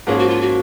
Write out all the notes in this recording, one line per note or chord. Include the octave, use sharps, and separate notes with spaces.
G#2 F3 A#3 C#4 G#4
F#4
F4
F#4